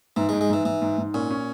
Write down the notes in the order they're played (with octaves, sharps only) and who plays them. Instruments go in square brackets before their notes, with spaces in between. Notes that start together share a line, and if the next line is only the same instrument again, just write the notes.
[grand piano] G#2 [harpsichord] E3
[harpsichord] G#3
[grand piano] G#2
[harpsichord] G#3
[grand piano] G#2 [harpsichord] E3
[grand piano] G#2 [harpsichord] E3
[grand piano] G#2
G#2
[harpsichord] A#2 [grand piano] C#4
[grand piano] C#4